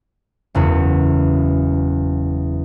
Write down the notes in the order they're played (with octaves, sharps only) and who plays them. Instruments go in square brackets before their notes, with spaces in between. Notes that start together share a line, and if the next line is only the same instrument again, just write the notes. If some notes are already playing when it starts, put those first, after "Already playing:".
[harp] F#1 E2 F#4